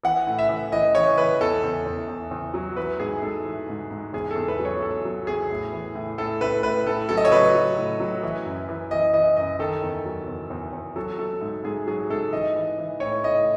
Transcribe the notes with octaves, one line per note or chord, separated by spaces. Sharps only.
E3 F#5
A2
E5
E3
E3 D#5
E3 C#5
E3 B4
E2 A4
E2
E2
E2
E2
F#3
E3 B4
G#2 G#4
G#2 A4
E3
G#2
G#2
E2 G#4
A4
E2
B4
F#3
C#5
E2 A4
F#3
E2 G#4
A2
E3
A2
A2 A4
A2 B4
A2 B4
A2 A4
F#3 A4
D#5
C#5
F#3 B4
F#3
A2
F#3
E3
F#2
E3
E3 D#5
E3 D#5
F#2 D#5
D#3 A4
E2
F#3
E2
E2
E2
F#3 A4
F#3 A4
G#2
G#2 G#4
F#3 G#4
G#2 A4
E3 D#5
E3
E3
A2 C#5
A2 D#5